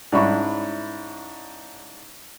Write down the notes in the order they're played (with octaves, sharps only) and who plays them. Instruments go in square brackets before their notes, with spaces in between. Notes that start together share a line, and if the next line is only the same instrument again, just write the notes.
[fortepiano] G#2 C#4 D4 E4 B5 C#6